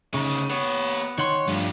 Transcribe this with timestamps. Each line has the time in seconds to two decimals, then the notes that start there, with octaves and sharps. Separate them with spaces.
0.14 D2 C#3 D#4
0.50 B3 G4 C#5
1.18 D#3 C#5 F#5 C6
1.48 G2 F3 A3